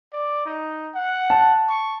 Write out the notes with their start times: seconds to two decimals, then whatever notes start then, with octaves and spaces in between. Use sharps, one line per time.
0.13 D5
0.45 D#4
0.94 F#5
1.30 A5
1.69 C#6